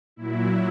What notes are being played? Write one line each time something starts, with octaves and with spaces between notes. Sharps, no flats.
A#2 F#3 E4